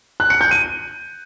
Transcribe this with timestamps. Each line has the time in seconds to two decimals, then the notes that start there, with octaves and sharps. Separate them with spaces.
0.20 F#6
0.30 C#7
0.41 G6
0.51 D#7